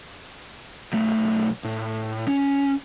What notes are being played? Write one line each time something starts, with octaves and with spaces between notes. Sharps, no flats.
B1 A3
A2
C#4